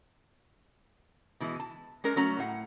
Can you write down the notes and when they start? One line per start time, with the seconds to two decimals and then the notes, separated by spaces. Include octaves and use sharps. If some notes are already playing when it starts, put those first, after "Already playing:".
1.40 B2 E3 G#3
1.60 A5
2.04 G#3 C#4 A#4 D5
2.16 F#3 A3 C#4 F#4 A#5
2.39 A2 F#5